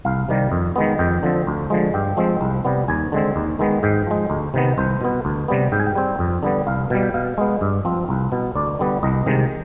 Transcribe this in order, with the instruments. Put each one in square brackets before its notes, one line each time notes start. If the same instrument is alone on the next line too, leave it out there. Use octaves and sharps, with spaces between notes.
[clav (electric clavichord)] C2 F5
C3 D#3 G3
F2
D#3 G#3 B3
F2 G5
D3 F3 C4
D2
D3 F3 G#3
G2 G5
F3 G#3 C4
C2
C3 G3 B3
D#2 G#5
D3 G#3 C4
D#2
D#3 G#3 B3
G#2 G5
F3 G#3
D2
C3 D#3 B3
C2 C5
B2 B3
D2
C3 G3 B3
G#2 G5
G#5
G5
G3 C4
F2
D3 G3 B3
C2 F5
B2 G3
G5
B2 F5
G#3 B3
G2
F3 C4
C2
B2 B3
D2 D5
D3 G3 B3
C2 D#5
C3 D#3 G#3